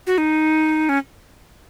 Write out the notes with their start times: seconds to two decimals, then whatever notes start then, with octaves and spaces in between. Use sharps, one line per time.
0.07 F#4
0.18 D#4
0.89 C#4